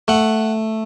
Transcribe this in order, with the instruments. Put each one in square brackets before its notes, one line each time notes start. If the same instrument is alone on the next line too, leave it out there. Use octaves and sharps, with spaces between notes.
[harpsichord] A3 F#5